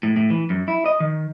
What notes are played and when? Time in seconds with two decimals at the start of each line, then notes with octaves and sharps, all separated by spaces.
0.03 A2
0.16 A2
0.30 E3
0.50 F#2
0.68 E4
0.86 D#5
1.00 D#3